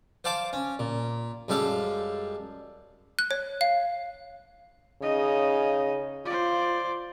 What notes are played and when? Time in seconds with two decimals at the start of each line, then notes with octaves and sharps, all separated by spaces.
0.24 C5 D5 F5 A5 D6
0.53 C#4
0.79 A#2
1.48 F#2 G3 G#3 A4 F5
3.19 F#6
3.31 C#5
3.61 F5
5.02 C#3 D#4 D#5
6.26 F4 C5 D5